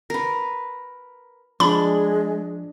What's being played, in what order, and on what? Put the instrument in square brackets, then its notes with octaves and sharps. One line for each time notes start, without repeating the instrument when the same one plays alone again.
[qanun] A#4 B4
[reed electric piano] F3 [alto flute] G#3 [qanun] D4 [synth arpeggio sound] B5